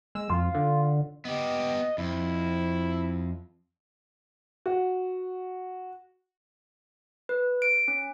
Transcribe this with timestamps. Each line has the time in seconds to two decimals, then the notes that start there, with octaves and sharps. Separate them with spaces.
0.15 G#3 E6
0.29 F2 F4
0.55 D3
1.25 B3 G4 D#5
1.98 F2 E4
4.66 F#4
7.29 B4
7.62 D7
7.88 C#4